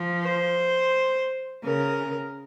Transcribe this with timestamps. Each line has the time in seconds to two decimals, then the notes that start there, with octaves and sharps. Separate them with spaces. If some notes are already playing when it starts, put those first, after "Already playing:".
Already playing: F3
0.22 C5
1.63 C#3 A#4